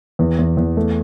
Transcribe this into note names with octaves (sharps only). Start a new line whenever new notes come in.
E2
E2
E2
A3